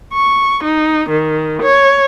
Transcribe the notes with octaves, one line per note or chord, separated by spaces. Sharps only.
C#6
D#4
D#3
C#5